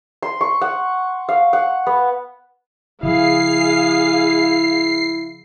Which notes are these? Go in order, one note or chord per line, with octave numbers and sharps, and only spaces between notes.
C6
C#6
F#5
F5
F#5
B3
C#3 F3 E4 G#4 F5 C7